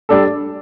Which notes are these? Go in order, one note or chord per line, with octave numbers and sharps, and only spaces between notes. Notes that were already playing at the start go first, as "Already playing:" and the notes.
G3 D4 A4